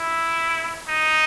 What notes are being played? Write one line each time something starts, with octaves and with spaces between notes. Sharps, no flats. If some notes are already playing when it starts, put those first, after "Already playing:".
Already playing: E4
D#4